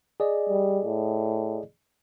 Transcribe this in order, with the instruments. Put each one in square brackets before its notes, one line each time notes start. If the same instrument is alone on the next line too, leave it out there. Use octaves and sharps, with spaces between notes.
[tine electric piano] G#4 D5 D#5
[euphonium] G3
A2